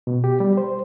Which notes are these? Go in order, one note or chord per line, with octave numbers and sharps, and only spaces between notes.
B2
G4
G3
C5